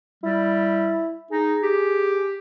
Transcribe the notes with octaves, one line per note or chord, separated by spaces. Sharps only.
G3 E4
D#4 G#4
G4